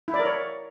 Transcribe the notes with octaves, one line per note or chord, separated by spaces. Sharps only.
E4
D5
A#4
C#5